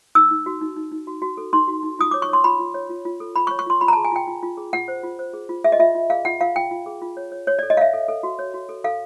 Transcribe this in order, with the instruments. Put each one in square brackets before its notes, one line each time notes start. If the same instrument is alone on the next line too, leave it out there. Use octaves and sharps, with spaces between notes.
[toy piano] D#4 E6
D#4
F#4
D#4
D#4
D#4
F#4
F#4
A4
D#4 C6
F#4
D#4
F4 D#6
C#5 D6
C#6
C#5 C6
F4 B5
F4
C#5
F4
F4
A4
F4 B5
C#6
C#5
C#6
F4 C6
F4 B5
A#5
G#4 A5
G#5
F4 G5
F4
F4
G#4
F4 F#5
C5
F4
C5
G#4
F4
G#4 E5
D#5
F4 E5
F4
G#4 F5
F4 F#5
F4 F5
F4 G5
F4
G#4
F4
C#5
C#5
C#5
A4 D5
D#5
C#5 E5 F5
A4
A4
F#4
C#5
F#4
A4
A4 F5